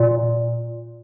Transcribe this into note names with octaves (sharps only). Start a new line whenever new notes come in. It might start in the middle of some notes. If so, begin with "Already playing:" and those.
Already playing: A#2